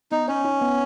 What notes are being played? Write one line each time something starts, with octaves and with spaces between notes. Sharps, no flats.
B3 D#4
C#4 C#5
D#4
B3